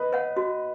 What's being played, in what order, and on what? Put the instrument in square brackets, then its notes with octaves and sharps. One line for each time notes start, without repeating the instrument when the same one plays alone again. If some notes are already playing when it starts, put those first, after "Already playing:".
Already playing: [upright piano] B4 D#5
[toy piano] C#5 F#5
F#4